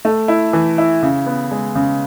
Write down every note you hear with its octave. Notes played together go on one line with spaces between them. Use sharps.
A3
E4
E3
E4
C#3
B3
G#3
C#3